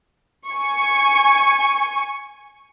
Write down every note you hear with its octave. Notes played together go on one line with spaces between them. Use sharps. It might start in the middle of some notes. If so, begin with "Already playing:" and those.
G#5 C#6